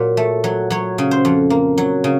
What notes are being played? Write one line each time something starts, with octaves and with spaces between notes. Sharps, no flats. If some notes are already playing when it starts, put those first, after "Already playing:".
Already playing: A#2 F#3
A3
F#3
F#3 C#5
C#3
C5
F2
A#3
F#3
C#3